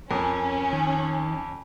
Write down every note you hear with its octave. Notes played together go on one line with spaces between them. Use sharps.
F2 C#4 A#4
D#3